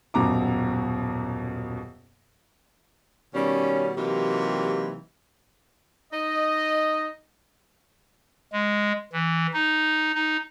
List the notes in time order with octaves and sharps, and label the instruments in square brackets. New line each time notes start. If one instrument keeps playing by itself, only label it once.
[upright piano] D#1 F#2 B2 A#5 D6
[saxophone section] B2 D#3 G3 C#4
C3 E3 F#3 A#3 D#4 G4
[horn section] D#4 D#5
[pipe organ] G#3
E3
D#4
D#4